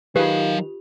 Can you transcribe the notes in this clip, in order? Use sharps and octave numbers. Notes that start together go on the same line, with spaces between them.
D#3 F#3 F4 G4 G#4 B4 F5